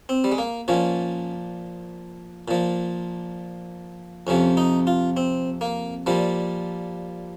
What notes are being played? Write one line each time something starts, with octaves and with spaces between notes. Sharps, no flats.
C4
G3
G#3
A#3
A#2 F3 C#4
A#2 F3
F2 C3 F3 C#4
D#4
F4
C4
A#3
A#2 F3 G3